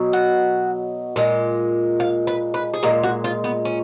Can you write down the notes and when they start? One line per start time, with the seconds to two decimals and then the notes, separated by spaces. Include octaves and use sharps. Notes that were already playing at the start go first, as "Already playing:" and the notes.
Already playing: B2 F#3
0.13 F#5
1.16 A#2 G#3
2.00 F5
2.27 B4
2.54 B4
2.74 G#4
2.83 A#2 G#3 A#4
3.03 F#4
3.24 F4
3.44 B3
3.65 C#4